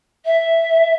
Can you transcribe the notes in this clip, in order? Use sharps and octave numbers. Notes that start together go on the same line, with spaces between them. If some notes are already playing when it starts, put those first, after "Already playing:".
E5